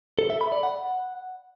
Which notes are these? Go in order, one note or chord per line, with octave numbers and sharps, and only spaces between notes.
A4
E5
B5
D5
F#5